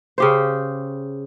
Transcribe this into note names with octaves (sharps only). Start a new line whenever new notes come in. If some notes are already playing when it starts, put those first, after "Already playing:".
C#3 G4 C5